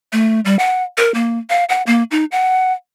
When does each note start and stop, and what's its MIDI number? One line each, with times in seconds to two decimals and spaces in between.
0.13 0.40 57
0.45 0.56 55
0.59 0.83 78
0.98 1.12 70
1.14 1.38 58
1.50 1.64 77
1.69 1.82 78
1.87 2.03 58
2.11 2.25 63
2.32 2.72 78